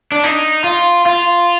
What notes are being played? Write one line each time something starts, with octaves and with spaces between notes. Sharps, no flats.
D4
D#4
F4
F4